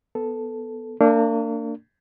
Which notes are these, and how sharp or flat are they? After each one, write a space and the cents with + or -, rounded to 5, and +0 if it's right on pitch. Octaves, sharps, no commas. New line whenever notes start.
B3 +0 A4 +0
A#3 -35 D4 +0